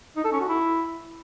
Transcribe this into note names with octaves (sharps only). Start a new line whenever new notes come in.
D#4
A4
C#4
F#4
E4